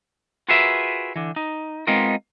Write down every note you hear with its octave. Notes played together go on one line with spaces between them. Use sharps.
F4 F#4 G#4 A#4 B4 E5
D3 E3
D#4
G#3 B3 C4 D#4 F4 A#4